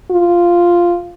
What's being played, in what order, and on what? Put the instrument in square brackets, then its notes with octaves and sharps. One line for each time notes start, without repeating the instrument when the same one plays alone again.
[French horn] F4